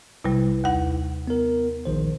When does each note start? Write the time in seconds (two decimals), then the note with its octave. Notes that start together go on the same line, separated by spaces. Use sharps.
0.24 B1 C3 G3 E4 B4
0.64 D#2 F#5
1.27 B3 A#4
1.85 A#1 D#3 C5